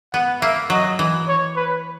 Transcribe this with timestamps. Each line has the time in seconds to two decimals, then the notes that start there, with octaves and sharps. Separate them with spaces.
0.14 B3 F#5
0.42 A#3 E5
0.70 F#3 D#5
0.99 E3
1.28 C#5
1.56 B4